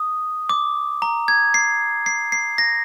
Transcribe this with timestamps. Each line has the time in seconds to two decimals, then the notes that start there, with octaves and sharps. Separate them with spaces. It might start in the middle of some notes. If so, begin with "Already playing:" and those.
Already playing: D#6
0.49 D6
1.02 A#5
1.28 G#6
1.54 C7
2.06 C7
2.32 C7
2.58 A#6